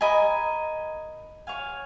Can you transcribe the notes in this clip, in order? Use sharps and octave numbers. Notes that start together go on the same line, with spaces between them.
A#4 D#5 G#5 B5
C#5 F5 G#5